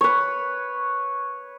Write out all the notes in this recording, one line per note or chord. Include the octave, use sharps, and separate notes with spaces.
B4 C#5